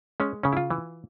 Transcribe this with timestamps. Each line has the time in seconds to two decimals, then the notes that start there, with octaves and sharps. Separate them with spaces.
0.20 G#3 C#4
0.43 C#3 C#4
0.53 E4
0.57 F4
0.70 E3